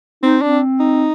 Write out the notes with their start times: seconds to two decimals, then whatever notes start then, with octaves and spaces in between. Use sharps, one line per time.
0.23 C4 D#4
0.42 C4 D4
0.80 D#4